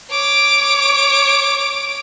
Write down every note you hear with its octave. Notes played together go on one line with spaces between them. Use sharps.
C#5 D6